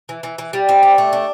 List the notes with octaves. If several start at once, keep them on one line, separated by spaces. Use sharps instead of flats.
E3
E3
E3
G3
C4
D4
A3
D4